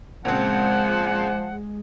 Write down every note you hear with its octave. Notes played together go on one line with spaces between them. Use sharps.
A#2 C#3 F3 G#3 C4 C5 F#5